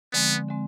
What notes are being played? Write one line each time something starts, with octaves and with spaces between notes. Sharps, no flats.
D3 F3 G#3 B3 C4
D3 G#3 C4